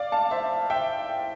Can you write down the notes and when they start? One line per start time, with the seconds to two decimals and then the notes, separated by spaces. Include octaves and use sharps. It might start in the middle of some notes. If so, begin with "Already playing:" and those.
Already playing: D5 F5
0.12 F5 A5
0.31 C5 E5
0.70 E5 G5